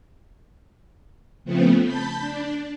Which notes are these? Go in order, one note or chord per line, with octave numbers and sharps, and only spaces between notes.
C#3 F3 A3 B3 C4
A5 B5 G6
D4